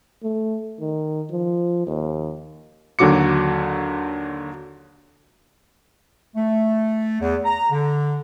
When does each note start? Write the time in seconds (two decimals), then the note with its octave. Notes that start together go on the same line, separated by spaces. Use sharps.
0.23 A3
0.80 D#3
1.31 F3
1.87 D#2
2.99 D#2 D3 F#3 F#4 D6 C#7
6.36 A3
7.21 E2
7.45 A#5
7.71 D3